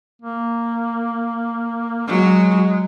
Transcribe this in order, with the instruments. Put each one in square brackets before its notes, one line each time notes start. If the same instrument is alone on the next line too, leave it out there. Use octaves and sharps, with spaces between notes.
[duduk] A#3
[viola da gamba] F#3 [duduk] G#3